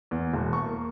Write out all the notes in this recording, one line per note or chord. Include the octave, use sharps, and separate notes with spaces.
E2
E1
C#6
A#3